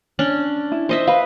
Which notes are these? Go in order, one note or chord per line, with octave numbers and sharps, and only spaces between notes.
C#4 D4
E4
C5 D#5 E5
B4 F5